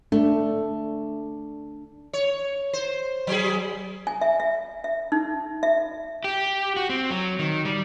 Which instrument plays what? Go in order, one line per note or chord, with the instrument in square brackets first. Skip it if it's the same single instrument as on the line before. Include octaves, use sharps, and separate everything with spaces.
[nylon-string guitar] A3 [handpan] D4
[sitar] C#5
C5
F#3 G#4
[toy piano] G#5
E5
E5
E5
D#4
E5
[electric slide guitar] G4
F#4
C4
F#3
D#3
G3